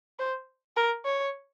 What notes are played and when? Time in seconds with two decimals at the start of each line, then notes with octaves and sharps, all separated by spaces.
0.19 C5
0.77 A#4
1.06 C#5